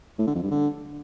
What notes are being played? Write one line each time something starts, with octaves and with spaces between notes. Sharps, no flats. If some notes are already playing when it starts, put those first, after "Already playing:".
A2
D3
F2
G2
D3